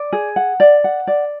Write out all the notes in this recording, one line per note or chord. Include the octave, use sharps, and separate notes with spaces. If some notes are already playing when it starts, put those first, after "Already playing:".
Already playing: D5
G#4
F#5
D5
F#5
D5